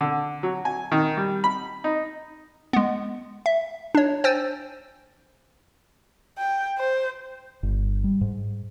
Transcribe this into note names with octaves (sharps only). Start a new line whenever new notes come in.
D3
F#3
G#5
D#3
G3
B5
D#4
G#3 B3
E5
D4 C#5
C5 G5 G#5 E6 A6
G5
C5
G1
G3
G#2